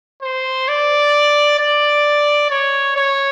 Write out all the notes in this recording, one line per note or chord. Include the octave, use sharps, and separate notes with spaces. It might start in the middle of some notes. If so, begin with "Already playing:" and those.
C5
D5
D5
C#5
C#5